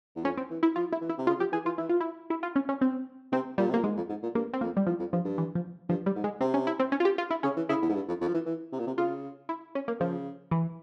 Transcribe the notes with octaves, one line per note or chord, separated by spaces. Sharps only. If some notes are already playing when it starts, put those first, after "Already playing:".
E2
F2 C#4
C4
E3
E4
F3 F4
E4
E3
E4
C3
C#3 F4
F3 G4
E3 G#4
E3 F4
E3 E4
F4
E4
E4
F4
C#4
C#4
C4
C3 C4
A#2 G3
C3
A#2 A#3
G#2 G#3
F2
G#2
A#2
G2 A#3
C4
F2 A#3
G3
E2 F3
F2
G2 F3
G2
E3
F3
G2 F3
G3
G#2
G#3
C3 C4
C#4
E4
C4
C#4
F4
G4
F4
E4
C#3 C#4
E3
C#3 E4
E2
G#2
G2
F2
F2
F3
E3
E3
C3
A#2
C3
C#3 F4
E4
C#4
A#3
C#3 F3
E3